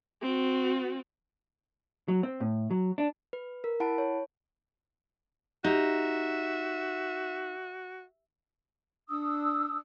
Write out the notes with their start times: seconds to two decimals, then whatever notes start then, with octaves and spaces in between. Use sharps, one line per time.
0.22 C4 F#4
2.08 F#3
2.23 C4
2.40 A2
2.71 F#3
2.98 D4
3.33 B4
3.64 A#4
3.80 E4 F#5 A5 B5 D7
3.98 C#5
5.64 D#4 F#4 G4 E5
9.09 D4 D#6 E6